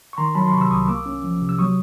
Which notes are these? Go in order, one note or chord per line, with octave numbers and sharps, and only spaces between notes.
C#6
D#3 A#5 C6
F#3 A5 B5
C6
C3 B5 C#6
E6
C2 C#6 D#6
A#3 D6 E6
C#4
F3
C3
E6
F#3 C#6 D#6